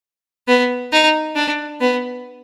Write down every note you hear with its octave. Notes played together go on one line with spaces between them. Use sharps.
B3
D#4
D4
B3